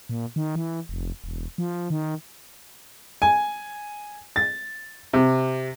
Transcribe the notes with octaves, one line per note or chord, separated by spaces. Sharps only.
A#2
D#3
E3
F1
E1
F3
D#3
G#5
A6
C3